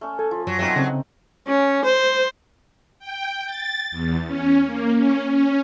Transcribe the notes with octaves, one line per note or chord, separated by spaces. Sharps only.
A3 C#4
A4 G#5
F3
F#2 F#3
B2 F#3 A3 C4 D#4
C#3 C4 D#5
C#4
C5
G5
A6
E2
C#4
A#3
C#4
C#4